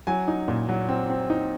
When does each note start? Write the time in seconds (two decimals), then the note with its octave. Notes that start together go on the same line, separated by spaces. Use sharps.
0.07 F#3 G#5
0.28 D#4
0.48 A#2
0.69 F#3
0.89 C4
1.10 C4
1.30 D#4